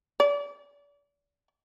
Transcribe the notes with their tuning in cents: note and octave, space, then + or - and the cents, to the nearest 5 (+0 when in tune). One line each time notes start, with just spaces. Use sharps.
D5 -35